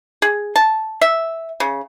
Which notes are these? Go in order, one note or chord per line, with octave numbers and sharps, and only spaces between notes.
G#4
A5
E5
C#3